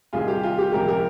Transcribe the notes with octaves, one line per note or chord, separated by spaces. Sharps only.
C2 C3 D#3 F4 G#4
G4
F4
G4
C#2 C3 F3 G4 A#4
G4 A#4